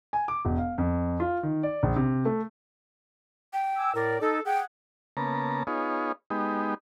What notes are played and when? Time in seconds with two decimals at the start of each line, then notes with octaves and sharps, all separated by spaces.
0.13 G#5
0.28 D6
0.45 E1
0.58 F5
0.78 F2
1.20 F4
1.43 D#3
1.63 D5
1.83 A#1
1.96 C3
2.25 A3
3.53 G5
3.77 G#5 D6 E6
3.95 A2 A#4 D5
4.21 D#4 A4
4.45 G#4 F#5 G5
5.17 C#3 A#3 B3 A5 A#5
5.67 B3 D#4 F4 G#4 C#5
6.30 G#3 B3 D#4 G4